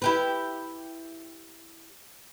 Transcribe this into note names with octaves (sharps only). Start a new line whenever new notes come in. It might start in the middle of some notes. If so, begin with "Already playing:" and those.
E4 G4 B4